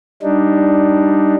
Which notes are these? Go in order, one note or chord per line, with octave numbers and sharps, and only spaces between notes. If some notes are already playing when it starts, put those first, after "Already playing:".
G3 D4 D#4